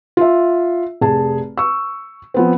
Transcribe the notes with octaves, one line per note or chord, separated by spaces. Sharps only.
F4 E5
F1 G#4 A5
C#6 E6
F3 B3 C4